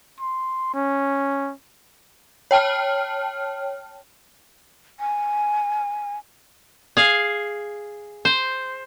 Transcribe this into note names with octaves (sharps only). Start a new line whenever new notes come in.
C6
C#4
C#5 G5 A5 F6
G#5
G#4 F5
C5